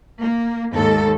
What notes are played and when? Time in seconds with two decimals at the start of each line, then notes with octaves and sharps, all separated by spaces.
0.19 A#3
0.73 D#2 G#2 A4